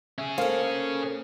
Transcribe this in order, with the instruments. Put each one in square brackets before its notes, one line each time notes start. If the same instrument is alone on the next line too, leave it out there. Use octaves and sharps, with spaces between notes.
[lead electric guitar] C#4 G#4 [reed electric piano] E5
[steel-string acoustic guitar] A#3 A4 [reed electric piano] C5 [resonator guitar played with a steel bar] F5